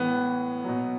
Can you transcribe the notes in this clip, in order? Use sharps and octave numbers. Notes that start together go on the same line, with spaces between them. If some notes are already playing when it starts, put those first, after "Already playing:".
Already playing: A2 E3 B3
B2 F#3